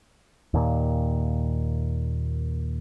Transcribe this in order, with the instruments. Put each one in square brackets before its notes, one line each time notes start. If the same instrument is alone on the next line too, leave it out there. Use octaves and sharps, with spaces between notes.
[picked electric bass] D#2 A#2